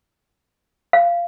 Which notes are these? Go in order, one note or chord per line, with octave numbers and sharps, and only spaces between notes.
F5